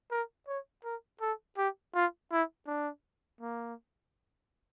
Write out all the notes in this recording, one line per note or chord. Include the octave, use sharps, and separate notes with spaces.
A#4
C#5
A#4
A4
G4
F4
E4
D4
A#3